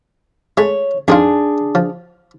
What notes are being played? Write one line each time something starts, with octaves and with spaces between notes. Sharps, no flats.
G#3 A3 C#5
F2 D4 D#4 F4 G#4
F3